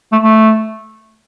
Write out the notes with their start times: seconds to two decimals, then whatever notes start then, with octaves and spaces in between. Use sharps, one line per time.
0.12 A3
0.23 A3